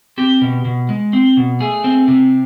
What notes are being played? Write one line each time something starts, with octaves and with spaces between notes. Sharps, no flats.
C4 G4
B2
B2
G#3
C4
B2
A3 G#4
C4
C3